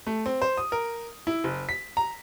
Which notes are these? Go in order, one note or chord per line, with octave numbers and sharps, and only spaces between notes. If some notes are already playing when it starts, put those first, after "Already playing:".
A3
C4
C5
D#6
A#4
E4
F#1
B6
A#5